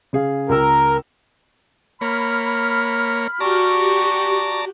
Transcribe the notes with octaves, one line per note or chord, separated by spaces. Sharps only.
C#3 G#4 F5
C#2 A#4 E6
A#3 C#5 B5 F6
F#4 G4 D5 A5 A#5 C#6